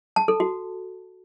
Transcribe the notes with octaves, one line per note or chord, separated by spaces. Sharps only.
A5
A4
F#4